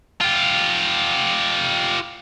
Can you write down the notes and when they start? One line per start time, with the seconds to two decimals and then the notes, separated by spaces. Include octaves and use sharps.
0.21 F4 G4